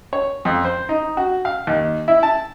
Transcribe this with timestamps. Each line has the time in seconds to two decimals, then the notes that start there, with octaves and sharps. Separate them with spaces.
0.13 C#5
0.45 F2
0.65 C5
0.89 D#4
1.17 F#4
1.45 F5
1.67 D#2
2.08 E4
2.23 A5